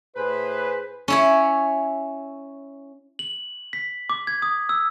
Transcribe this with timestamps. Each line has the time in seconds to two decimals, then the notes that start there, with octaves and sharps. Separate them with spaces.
0.16 A2 G#4 B4 C5
1.08 C#4 E4 C#5
3.19 F#7
3.73 B6
4.10 D6
4.27 G#6
4.42 D#6
4.69 E6